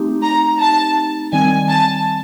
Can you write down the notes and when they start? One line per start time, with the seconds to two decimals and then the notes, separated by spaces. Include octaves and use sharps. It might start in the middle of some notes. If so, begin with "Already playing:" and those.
Already playing: A3 C4 D#4 G4
0.22 A#5
0.60 A5
1.32 D#3 G3 C4 G#5
1.69 A5